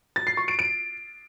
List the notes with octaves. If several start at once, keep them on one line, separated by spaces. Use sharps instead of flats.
A6
C7
C#6
D7
D7